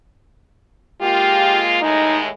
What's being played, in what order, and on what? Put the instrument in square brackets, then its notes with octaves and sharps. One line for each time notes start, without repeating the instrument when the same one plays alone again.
[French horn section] G#3 A#3 F4 [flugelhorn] G4
[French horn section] D#2 A2 G#3 [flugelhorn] D#4